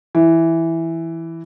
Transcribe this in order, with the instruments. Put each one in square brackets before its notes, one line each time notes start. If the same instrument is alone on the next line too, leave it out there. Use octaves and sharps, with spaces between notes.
[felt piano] E3